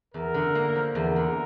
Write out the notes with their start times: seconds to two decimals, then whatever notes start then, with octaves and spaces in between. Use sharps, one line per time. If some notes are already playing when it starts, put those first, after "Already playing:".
0.14 E2 A#4
0.34 D3
0.55 A#3
0.75 F3
0.95 E2 A#4
1.16 D3